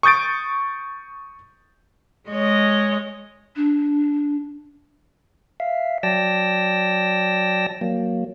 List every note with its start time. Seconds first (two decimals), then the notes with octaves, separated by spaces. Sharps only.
0.03 C#6 D#6 G6 A6 D7
2.30 G#3 C#5 D#5
3.56 D4
5.60 E5 F5
6.03 F#3 D5 G5 A5 E6 A#6
7.81 F#3 A#3